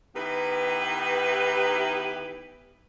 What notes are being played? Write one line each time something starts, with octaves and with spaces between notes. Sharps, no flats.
D#3 E3 B3 E4 G4 B4